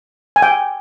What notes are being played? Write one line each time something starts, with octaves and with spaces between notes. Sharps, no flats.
G#5
G5